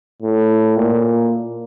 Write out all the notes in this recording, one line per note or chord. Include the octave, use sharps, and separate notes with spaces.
A2
A#2